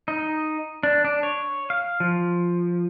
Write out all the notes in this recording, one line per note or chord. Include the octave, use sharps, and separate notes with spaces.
D#4
D4
D4
C#5
F5
F3